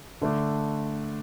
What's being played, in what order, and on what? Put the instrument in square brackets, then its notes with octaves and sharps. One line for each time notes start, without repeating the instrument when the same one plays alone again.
[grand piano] D3 A3 D4